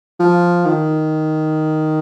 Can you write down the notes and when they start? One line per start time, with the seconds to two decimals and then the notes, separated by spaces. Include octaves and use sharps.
0.19 F3
0.65 D#3